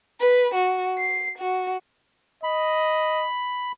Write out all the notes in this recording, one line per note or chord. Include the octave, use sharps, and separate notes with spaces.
B4
F#4
C7
F#4
D#5 B5